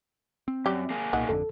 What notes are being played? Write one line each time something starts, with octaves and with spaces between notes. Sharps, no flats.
C4
F#2 G3 G4
A#3 G#4
B1 A#2 D#4 F#5
G#1 F2 D3 A4